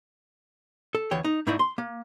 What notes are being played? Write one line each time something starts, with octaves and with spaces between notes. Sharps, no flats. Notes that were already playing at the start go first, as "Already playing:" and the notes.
A4
D2 E3 C#5 G5
D#4
G#2 A3 D#4 E4 D5 D#5
C6
A#3